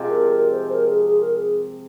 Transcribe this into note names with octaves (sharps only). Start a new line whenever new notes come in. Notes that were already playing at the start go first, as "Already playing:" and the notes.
Already playing: C3 F3 G#3 C4
A#4
A#4
C5
A#4
G#4
G#4
A#4
G#4